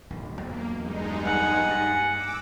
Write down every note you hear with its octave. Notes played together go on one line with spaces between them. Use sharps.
D1 B1
E2 F#3 A#3 B3
G2 G#3 D#4
F#5 G#5
G2
D6 E6